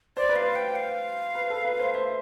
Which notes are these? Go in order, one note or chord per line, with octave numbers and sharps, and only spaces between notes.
C5 D5
B4
F5
C5
G5
F5
B4
A4
B4
C5
C5 E5